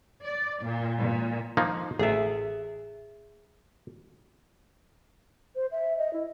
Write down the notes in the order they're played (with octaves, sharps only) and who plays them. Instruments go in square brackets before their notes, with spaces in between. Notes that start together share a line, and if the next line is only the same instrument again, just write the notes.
[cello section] D5
A#2
A#2
[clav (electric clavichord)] F3 A#3 D#4
[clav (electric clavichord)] A1 [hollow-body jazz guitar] G#4 E5
[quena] C5
E5
D#5
E4